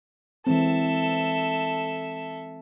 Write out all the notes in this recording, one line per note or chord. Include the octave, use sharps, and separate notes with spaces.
E3 G#3 C4 A4 E5